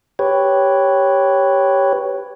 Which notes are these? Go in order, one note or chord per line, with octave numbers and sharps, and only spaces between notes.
G4 B4 C#5